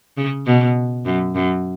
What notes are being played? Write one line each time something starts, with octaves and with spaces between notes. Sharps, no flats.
C#3
B2
F#2
F#2